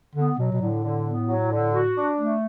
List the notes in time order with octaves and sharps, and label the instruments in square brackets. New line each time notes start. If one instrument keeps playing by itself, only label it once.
[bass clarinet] D3 [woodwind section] B3
[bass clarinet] B2 [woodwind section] F#3
[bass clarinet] B2
[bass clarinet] A2 [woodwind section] D3
[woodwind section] D3
B3
F#3
D3
F#4
D4
A3